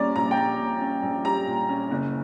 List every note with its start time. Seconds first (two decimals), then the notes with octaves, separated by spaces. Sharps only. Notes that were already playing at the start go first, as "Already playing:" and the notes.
Already playing: A#1 A#2 G3 C#4 D5 A#5
0.16 A#1 A#5
0.31 G5
0.37 G3 A#5
0.60 A#2
0.81 C#4
1.03 A#1
1.25 G3 A#5
1.47 A#2
1.69 C#4
1.91 F#1